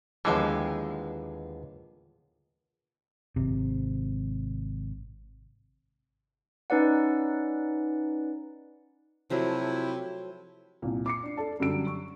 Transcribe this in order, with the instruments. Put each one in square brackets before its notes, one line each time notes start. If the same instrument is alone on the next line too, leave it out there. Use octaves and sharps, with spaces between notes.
[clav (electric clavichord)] D#2 D3 E3 [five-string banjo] F3 G#3 B3
[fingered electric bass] G#1 C3
[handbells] C#4 D#4 B4 D5 F#5
[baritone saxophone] C3 [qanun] F3 F#3 A3 [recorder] E4
[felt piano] C2 A#2
D6 C7 C#7
D4
A4 D5 A5
F#2 D3 F#3 G3 E6 D7
C#6